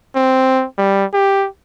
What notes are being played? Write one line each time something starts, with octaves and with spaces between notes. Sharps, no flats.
C4
G3
G4